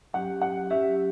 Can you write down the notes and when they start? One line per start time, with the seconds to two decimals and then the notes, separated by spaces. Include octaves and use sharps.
0.14 F#3 C#4 G4 F#5
0.42 F#5
0.70 F#3 C#4 G4 E5